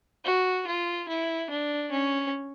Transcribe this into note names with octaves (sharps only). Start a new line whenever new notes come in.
F#4
F4
E4
D4
C#4